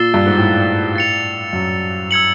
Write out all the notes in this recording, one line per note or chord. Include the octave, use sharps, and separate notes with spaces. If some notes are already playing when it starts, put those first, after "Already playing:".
Already playing: A#2 E6 A6 C7 E7 G7
G2
G#2
A2
A6 C#7 F7
F#2
E6 G#6 C#7 F#7